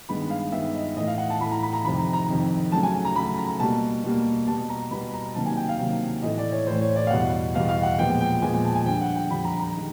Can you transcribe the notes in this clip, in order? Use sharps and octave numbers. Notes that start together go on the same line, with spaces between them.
G2 D#3 G#3 B3 B5
F5
G2 D#3 G#3 B3 E5
D#5
A2 E3 A3 D#5
F5
F#5
A5
A2 E3 A3 B5
A#5
B5
A#5
F2 C3 D#3 B5
A#5
A#5
F2 C3 D#3
C#3 F#3 A3 A5
G#5
A#5
C#3 F#3 A3 B5
A#5
B2 G3 A#3 A5
B2 G3 A#3
B2 G3 B3 A5
A#5
B2 G3 B3 B5
A#5
C3 D#3 F#3 A#3 A5
G#5
G5
F5
C3 D#3 F#3 A#3
A2 E3 A3 D#5
D5
C#5
A2 E3 A3 C5
C#5
D5
F5
E2 B2 G3 F#5
E2 B2 G3 F5
F5
F#5
A#2 F3 G#3 B3 G5
G5
A#2 F3 G#3 B3 G#5
G#5
A5
G#5
F2 D3 G3 G5
F#5
G5
F2 D3 G3 B5
A#5
A#5
D#3 G#3